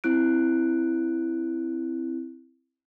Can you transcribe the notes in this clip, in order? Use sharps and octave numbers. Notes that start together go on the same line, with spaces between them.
C4 E4 F#6 D7